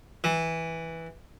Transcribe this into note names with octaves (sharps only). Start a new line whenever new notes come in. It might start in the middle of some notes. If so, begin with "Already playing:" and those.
E3